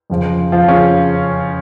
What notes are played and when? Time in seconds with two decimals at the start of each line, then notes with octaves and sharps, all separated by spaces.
0.10 F1 F2 C#3 F3
0.52 F3 F4
0.68 C#3 C#4